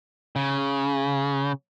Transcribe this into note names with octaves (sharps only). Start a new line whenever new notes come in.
C#3